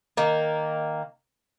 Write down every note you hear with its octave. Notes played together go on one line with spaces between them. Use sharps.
D#3 A#3